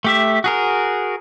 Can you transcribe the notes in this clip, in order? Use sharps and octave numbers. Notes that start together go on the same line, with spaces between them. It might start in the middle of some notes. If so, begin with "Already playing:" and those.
A3 G4 E5
F#4 G#4 A#4